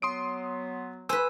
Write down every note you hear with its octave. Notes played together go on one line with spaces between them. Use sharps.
F#3 B3 C6 D#6 D7
B4 C5 G#5 E6